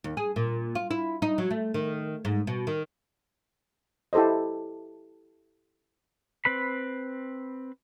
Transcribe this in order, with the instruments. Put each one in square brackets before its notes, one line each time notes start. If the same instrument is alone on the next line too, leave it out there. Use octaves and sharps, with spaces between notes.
[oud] D#2
G#4
A#2
F4
E4
D#4
F#3
A3
D#3
G#2
B2
D#3
[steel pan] E4 G4 A4 C5 D#5
[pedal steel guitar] C4 B4 B5